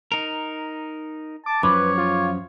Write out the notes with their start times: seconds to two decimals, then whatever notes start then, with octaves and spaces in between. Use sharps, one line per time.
0.12 D#4 A#4
1.46 A5 D6
1.63 F#2 F3 B4 C#5 D6
1.98 F4